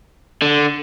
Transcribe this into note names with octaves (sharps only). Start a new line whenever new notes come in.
D3